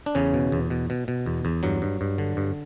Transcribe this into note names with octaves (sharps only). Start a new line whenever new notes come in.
D4
E2 C#3 C#4
B2
E2
B2
B2
B2
E2
E2
G2 F#3
G2
G2
D3
G2